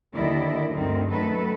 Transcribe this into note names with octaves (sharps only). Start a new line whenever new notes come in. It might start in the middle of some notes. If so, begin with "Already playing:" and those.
D#2 D3 D#3 E4 D5 D#5
D2 G2 D3 D#3 C4
F#2 D#3 F#3 A3 A4 B4